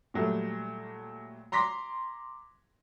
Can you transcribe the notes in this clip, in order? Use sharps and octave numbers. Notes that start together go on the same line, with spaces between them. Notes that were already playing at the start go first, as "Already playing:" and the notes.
A#2 F#3 G3 A3
A#5 C6 D6 A#6 B6